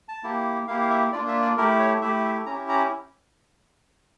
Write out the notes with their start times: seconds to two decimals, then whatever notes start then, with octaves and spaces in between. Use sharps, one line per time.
0.08 A5
0.24 A#3 E4 G4
0.67 A#3 E4 G4 F5
0.81 F5
0.90 E5
1.12 A#3 D4 F4 D5
1.28 E5
1.42 D5
1.57 A3 E4 G4 A#4
1.79 C#5
2.02 A3 E4 G4 E5
2.25 E5
2.46 C#4 E4 G4 A#5
2.69 A#5